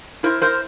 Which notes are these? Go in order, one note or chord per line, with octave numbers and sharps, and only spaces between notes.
E4 A#4 C5
A#4 C5